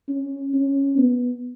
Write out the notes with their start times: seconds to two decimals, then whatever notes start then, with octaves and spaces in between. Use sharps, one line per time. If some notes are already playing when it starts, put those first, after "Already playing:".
0.09 C#4
0.54 C#4
0.98 B3